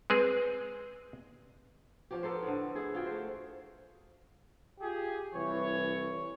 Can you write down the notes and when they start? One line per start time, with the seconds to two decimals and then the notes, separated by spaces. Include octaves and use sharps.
0.10 G#3 C4 G#4 B4
2.11 F3 C#4 G4
2.23 B3 A4 A#4 C5
2.43 A2 D3
2.75 E4 G#4
2.94 F4 F#4 G#4 G5
3.06 A3 C5
4.80 F4 G4 G#4
5.33 C2 E3 C#5